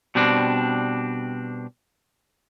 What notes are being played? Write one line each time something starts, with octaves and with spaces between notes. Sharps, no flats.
B2 G3 C4 D4